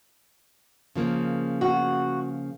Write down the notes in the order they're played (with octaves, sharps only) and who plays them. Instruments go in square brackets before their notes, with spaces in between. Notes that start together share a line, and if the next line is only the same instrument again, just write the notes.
[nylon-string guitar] C#3 F3 A#3
[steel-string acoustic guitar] F#4